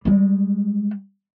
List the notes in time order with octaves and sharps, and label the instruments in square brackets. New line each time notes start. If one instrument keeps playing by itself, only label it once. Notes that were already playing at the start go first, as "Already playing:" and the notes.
[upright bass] G3 G#3